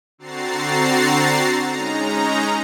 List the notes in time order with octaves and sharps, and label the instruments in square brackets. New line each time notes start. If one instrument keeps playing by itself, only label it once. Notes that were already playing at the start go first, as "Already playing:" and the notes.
[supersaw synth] D3 C4 F#4 A#5 A6 C7
G#3 C#4 D#4 A#5